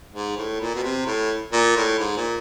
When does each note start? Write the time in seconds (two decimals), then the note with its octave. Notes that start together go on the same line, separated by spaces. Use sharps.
0.14 G#2
0.37 A2
0.60 A#2
0.75 B2
0.84 C3
1.07 A2
1.53 A#2
1.76 A2
1.99 G#2
2.17 A#2